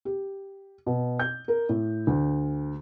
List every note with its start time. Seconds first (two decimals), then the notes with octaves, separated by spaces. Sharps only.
0.05 G4
0.86 B2
1.19 G6
1.48 A#4
1.69 A2
2.07 D2